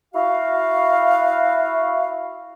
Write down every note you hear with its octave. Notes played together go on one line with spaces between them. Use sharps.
E4 F#4 F5